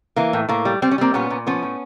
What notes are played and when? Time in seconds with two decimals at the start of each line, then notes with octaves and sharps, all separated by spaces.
0.16 E3 A#3
0.33 A2
0.49 A2 A#3
0.65 G3
0.82 G3 C4
0.91 C#4
0.98 G3 A#3 C4
1.14 A#2 B3 C#4
1.30 A#2
1.47 F3 B3 C#4
1.63 A2